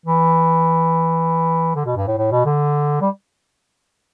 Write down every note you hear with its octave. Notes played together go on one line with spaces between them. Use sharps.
E3
D3
B2
G2
A2
A2
B2
D3
G3